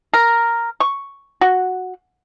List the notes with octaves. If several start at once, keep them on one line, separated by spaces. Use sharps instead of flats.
A#4
C#6
F#4